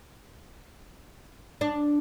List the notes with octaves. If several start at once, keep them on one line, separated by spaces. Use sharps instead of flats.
D4